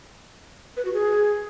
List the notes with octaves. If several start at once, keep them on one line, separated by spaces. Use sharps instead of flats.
B4
F#4
G#4